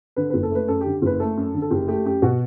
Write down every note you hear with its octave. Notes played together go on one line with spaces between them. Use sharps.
D3 B4
F#1 B4
A4
A3 B4
F#2 A4
D3 G4
F#1 B4
A3 A4
F#2
D3
A4
F#1 G4
A3 G4
F#2 G4
B2 F#4